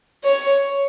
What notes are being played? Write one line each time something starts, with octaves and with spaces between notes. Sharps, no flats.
C#5